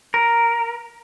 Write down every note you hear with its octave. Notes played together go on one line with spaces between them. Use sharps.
A#4